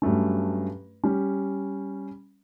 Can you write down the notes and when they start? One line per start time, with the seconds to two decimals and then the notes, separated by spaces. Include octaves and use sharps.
0.02 G2 F#3 A3 C#4
1.04 G3 C#4